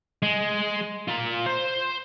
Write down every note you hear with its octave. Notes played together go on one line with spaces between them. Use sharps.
G#3
F4 A#5
C5